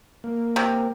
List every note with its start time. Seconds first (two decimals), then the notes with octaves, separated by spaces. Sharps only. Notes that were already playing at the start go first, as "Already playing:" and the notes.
0.24 A#3
0.56 C3